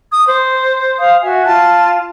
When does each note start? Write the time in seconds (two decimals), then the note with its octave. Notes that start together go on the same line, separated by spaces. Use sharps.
0.12 D#6
0.27 C5
0.98 F5 D#6
1.21 F#4 E5 G#5
1.45 F4 A5